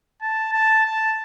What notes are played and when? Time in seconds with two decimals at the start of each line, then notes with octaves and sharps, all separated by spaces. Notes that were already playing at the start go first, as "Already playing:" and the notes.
0.22 A5
0.53 A5
0.85 A5